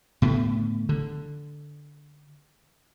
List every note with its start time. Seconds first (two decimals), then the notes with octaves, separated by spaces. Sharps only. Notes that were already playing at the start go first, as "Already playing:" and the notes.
0.22 A2 D3 B3
0.89 D3